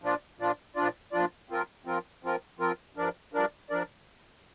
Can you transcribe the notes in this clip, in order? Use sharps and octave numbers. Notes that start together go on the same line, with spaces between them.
A#2 F3 D4 F4 D5
A#2 F3 D4 F4 D5
A#2 F3 D4 F4 D5
A#2 F3 D4 F4 D5
F3 C4 F4 A#4
F3 C4 F4 A#4
F3 C4 F4 A#4
F3 C4 F4 A#4
G2 F3 D4 A#4 D5
G2 F3 D4 A#4 D5
F3 D4 A#4 D5